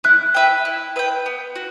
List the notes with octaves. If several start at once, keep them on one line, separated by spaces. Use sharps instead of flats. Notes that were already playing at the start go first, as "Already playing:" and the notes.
E4 F#6
B4 E5 G5
E4
B4 E5 G5
B3
F#4